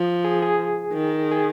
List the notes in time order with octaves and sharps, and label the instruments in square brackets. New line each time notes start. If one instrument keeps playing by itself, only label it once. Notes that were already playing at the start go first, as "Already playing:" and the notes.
Already playing: [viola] F3
[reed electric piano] G#4
G#4
[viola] D#3
[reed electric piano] G#4